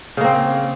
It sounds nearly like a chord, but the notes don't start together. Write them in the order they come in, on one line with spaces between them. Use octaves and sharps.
C#3 A#3 C4